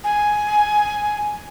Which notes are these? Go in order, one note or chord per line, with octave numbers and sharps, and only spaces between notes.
G#5